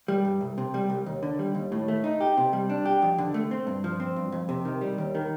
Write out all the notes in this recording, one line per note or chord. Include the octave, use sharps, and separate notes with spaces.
G3
G2
C2
C3
G3
C2
D#2
D3
G3
D#2
A2
A3
D#4
G4
C3
G3
D4
G4
F2
D3
A3
C4
G2
F3
C4
G2
F2
C3
D#3
G3
D#2
D#3